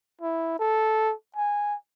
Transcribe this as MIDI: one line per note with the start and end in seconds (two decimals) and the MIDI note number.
0.21 0.57 64
0.59 1.14 69
1.36 1.75 80